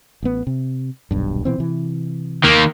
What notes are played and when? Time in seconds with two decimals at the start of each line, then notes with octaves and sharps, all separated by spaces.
0.23 A1 B3
0.47 C3
1.11 D#1 B1 G2
1.45 B2 E3 C4
1.58 C3 E3
2.44 D#3 A#3